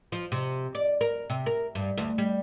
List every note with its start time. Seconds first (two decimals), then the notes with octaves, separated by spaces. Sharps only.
0.12 F3
0.32 C3
0.75 D5
1.01 A#4
1.30 C3
1.46 A#4
1.75 G2
1.97 D2
2.18 G3